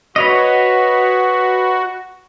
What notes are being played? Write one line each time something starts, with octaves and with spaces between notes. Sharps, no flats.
F#4 B4 C#5 D#5